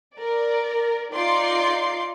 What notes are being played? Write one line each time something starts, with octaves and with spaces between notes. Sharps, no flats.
A#4 D5
D#4 F4 D5 C6 D6 C7